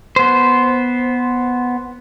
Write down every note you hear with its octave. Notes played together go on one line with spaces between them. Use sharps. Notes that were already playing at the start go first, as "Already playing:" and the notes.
B3 C5